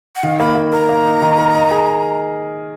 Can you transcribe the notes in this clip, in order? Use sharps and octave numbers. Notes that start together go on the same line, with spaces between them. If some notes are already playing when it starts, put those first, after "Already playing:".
F#5
D#3 F5
A#3 B5
A#3
A#4 A#5
A#3
D#4
D#3
A#4
D#5
G#4
D#5